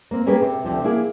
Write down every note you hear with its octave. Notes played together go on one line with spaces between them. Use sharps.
A#3 C4
A#3 C#4 G4 G#4 B4
C3
D2 G2 C3 F3
A#3 E4 G#4